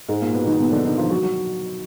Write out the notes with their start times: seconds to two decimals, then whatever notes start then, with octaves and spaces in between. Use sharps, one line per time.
0.09 G#2 G#3
0.21 A#2 A#3
0.34 B2 B3
0.47 D#3 D#4
0.60 B2 B3
0.72 D3 D4
0.84 D#3 D#4
0.98 F3 F4
1.10 F#3 F#4
1.23 F#3 F#4